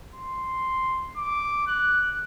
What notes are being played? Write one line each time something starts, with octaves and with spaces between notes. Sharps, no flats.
C6
D6
F#6